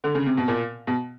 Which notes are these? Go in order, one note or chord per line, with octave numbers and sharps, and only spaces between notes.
D3
C#3
C3
B2
A#2
B2